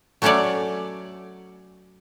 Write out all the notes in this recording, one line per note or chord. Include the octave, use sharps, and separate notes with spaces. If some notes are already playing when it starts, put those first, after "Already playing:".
F#3 A3 C#4 A4 C#5 D5